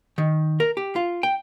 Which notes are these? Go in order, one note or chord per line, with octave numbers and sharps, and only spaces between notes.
D#3
A#4
G4
F4
G5